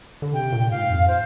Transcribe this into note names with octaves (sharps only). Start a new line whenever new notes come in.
D3
C3 G5
A#2
G5
G#2 F5
F2
C5